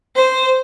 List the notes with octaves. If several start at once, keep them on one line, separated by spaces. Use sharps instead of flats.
C5